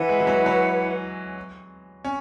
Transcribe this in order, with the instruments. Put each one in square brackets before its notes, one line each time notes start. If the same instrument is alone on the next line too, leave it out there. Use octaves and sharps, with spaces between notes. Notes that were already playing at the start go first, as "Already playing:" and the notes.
Already playing: [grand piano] E3 [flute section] E4 B4 F#5
[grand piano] G#3
E3
F#3
F#3
C#4